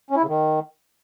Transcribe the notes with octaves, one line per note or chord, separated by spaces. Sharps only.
C#4
E4
C#3
D#3